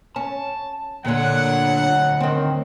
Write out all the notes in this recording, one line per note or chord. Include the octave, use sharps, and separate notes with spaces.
C#4 A5
D2 A#2 D3 C#5 F#5
D#3 C4